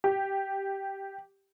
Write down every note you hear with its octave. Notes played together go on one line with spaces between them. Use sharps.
G4